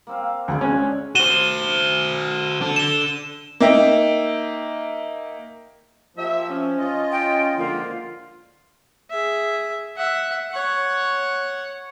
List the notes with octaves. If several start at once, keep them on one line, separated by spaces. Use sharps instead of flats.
A#3 C4 F5
D2 D3 G#4 A4
G#3 C#4
F#4 C5 D#7 E7 G7
D4 A4
E7 G7
A#3 D#4 E5 G5
F3 A#3 G4 E5
C#4
F4 D#5
G5
D3 F3 G#3 A#3 F4
G#4 E5
E5 F#5
C#5 F#5